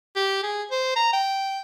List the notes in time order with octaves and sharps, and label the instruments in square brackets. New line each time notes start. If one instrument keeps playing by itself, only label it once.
[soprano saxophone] G4
G#4
C5
A#5
G5